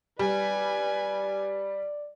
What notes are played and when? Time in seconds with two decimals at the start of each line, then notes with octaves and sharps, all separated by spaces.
0.19 G3 B4 D5 G#5